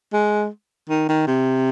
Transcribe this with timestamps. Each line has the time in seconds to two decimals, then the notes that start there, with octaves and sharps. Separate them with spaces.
0.13 G#3
0.89 D#3
1.09 D#3
1.27 C3